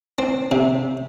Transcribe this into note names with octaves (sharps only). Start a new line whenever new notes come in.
C4
C3